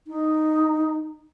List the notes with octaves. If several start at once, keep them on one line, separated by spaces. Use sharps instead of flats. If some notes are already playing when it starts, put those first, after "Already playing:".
D#4